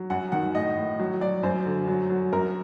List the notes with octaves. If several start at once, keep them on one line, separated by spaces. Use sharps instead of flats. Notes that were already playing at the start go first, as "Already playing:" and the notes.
Already playing: F#3
F#2 F#5
D#3 F#5
A2 D#5
A2
F#3
F#3 D5
F#2 C5
D3
F#3
F#3
F#2 A#4